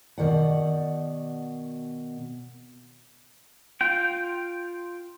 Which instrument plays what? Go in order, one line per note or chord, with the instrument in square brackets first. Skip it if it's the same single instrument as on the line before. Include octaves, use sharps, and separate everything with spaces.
[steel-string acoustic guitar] B2 D#3 D5 F#5
[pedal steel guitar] F4 G5